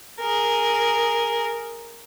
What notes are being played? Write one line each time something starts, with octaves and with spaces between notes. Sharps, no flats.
G#4 A#4